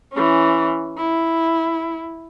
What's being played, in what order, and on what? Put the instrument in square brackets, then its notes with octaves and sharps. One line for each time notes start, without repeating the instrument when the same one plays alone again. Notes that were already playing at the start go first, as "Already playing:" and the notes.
[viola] E3 C#4
E4